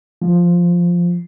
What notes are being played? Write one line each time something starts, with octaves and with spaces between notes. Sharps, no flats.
F3